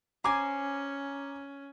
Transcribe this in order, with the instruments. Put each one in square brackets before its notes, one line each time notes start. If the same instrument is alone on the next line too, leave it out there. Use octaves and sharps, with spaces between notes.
[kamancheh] C#4 [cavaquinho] C5 G#5 [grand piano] A#5 D6